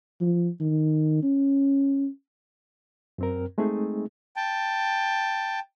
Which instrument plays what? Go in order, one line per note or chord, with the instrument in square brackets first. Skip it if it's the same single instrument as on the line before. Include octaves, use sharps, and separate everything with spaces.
[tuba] F3
D#3
C#4
[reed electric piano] F#2 C4 A#4
G#3 A3 C4 D#4 G#4
[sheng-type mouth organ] G5 A5